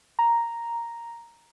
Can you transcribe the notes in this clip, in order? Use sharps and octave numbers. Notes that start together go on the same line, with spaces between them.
A#5